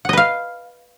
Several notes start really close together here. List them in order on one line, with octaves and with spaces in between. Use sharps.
F#5 D#5 B4 F5